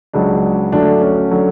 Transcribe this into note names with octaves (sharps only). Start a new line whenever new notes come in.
C#2 C#3 F#3 D4
D2 D3 F#3 D4
C#4
D3 F#3